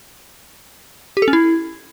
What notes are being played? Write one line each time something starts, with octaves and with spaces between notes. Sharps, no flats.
G4
A4
C#4
E4